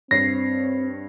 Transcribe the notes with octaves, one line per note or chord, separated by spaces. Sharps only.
G2 C4 C#5 A#6 C7